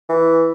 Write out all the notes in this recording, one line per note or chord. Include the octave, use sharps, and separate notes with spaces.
E3